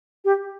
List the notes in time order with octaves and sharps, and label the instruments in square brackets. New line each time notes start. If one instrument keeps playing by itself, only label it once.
[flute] G4